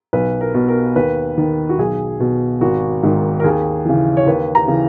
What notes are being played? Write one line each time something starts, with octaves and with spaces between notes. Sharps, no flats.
B1 B4
A#4
B2
A#4
D#2 B4
D#3
F#4
B1 G#4
B2
G#1 F#4
G#2 D#3
A#4
D#2 G#4
C#3 E3
C#5
D#2 B4
A#5
C#3 E3